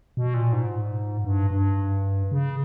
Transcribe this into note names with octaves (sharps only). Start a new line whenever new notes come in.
B2
A#2
G#2
G2
G2
C#3